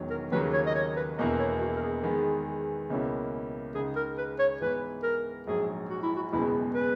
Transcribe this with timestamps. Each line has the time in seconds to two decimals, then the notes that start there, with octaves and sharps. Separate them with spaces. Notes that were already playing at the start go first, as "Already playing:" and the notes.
Already playing: E1 E2 D#3 F#3
0.10 A#4
0.32 D#2 C#3 F#3 A#3 D#4 B4
0.54 C#5
0.66 D#5
0.75 C#5
0.96 B4
1.18 E1 E2 B2 A#3 E4 D#5
1.39 C#5
1.61 F#4
1.76 A#4
1.82 G#4
2.03 E2 D#3 G#3 B3 G#4
2.90 C#2 B2 A#3 C#4 E4
3.75 C#2 C#3 G#3 D#4 G#4
3.96 A#4
4.18 B4
4.39 C#5
4.60 G#2 E3 B3 E4 B4
5.03 A#4
5.47 A#1 G#2 F#3 G#4
5.89 F#4
6.03 E4
6.16 F#4
6.31 F#1 E2 B2 G#3 E4
6.75 B4